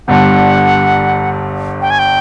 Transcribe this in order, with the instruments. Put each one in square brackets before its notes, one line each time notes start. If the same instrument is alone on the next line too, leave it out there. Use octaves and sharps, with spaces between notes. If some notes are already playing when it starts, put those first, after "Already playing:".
[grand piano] G1 G2 D3 [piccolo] F#5
[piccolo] G5
G#5
G5